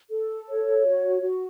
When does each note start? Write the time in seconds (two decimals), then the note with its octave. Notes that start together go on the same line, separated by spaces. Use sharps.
0.10 A4
0.48 C#5
0.85 F#4
1.22 F#4